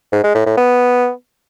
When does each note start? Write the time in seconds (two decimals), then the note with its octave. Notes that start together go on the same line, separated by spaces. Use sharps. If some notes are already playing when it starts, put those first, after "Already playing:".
0.12 G#2
0.23 G#3
0.35 A2
0.46 A2
0.57 B3